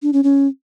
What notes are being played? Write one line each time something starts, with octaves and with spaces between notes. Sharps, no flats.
D4
C#4
C#4